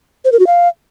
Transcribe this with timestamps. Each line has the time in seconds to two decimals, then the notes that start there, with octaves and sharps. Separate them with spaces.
0.25 C5
0.32 A#4
0.39 F#4
0.47 F5